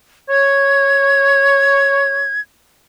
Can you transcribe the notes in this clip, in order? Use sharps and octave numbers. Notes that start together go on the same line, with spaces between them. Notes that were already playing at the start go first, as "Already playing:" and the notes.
C#5 G#6